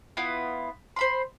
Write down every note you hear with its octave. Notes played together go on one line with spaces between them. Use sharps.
B3 E4 F4
C5 B5 C6